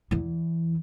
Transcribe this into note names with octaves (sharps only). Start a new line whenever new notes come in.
E2 E3